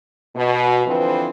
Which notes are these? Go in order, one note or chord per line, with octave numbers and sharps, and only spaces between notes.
B2
D3 E3 F3 C4 B4